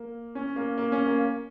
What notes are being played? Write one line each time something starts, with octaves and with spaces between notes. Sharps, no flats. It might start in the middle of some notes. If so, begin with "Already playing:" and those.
Already playing: A#3
C#4
A#3
A#3
C#4
A#3